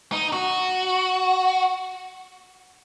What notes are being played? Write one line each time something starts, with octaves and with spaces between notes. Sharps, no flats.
D#4
F#4